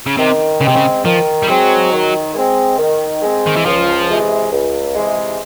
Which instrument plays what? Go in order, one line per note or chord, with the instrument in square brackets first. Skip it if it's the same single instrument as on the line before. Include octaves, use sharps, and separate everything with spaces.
[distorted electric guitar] C#3
[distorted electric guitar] C3 [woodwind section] D#3
[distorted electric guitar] C#3 [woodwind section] G#3
[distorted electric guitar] C3 [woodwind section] C4
[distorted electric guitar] C#3
[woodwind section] D#3 [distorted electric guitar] F3
[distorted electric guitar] G3
[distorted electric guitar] F#3 [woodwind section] G#3 C4
[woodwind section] D#3
G#3 C4
D#3
G#3 C4
[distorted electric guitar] D#3
E3
[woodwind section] C#2 [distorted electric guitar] F3
[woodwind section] C3 E3 G#3
C#2
C3 E3 G#3